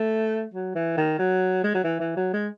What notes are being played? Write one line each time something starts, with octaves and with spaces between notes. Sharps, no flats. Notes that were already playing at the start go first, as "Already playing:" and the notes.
Already playing: A3
F#3
E3
D#3
F#3
G#3
F#3
E3
E3
F#3
G#3